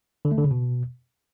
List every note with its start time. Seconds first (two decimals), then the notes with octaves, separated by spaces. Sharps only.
0.25 D3
0.31 A3
0.38 D3
0.44 C#3
0.51 B2